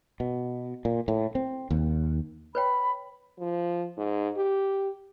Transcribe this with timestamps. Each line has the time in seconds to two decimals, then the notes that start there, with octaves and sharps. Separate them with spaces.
0.20 B2
0.85 A#2
1.08 A2
1.35 C4
1.71 D#2
2.55 B4 C#5 G5 B5
3.39 F3
3.97 G#2
4.37 G4